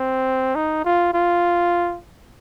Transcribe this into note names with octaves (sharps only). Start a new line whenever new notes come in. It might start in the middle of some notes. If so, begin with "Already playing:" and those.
Already playing: C4
D#4
F4
F4